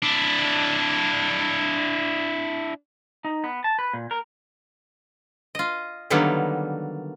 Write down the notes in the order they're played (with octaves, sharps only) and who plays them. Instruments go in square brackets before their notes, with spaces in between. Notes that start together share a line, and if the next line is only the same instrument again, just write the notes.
[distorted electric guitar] D4 E4
[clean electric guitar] D#4
B3
A5
B4
A#2
A#4
[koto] F4 D#5
D3 D#3 F#3 G3 A#3 B3